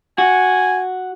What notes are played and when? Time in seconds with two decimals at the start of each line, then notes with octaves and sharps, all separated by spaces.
0.18 F#4 G#5